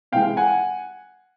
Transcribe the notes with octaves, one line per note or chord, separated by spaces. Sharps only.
C3 E3 G#3 F5 G5
F#5 G#5